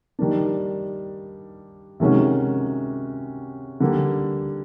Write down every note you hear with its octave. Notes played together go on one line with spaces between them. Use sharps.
D#3 G3 A#3 D4
C3 D#3 G#3 C#4 F#4
D3 G3 A#3